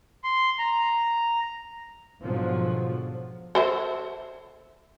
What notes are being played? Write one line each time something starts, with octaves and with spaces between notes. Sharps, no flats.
C6
A#5
G#2 B2 D3 F3 F#3
A4 C5 E5